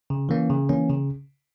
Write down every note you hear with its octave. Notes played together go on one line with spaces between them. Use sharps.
C#3
E3 A#3 C#4
C#3
E3 A#3 C#4
C#3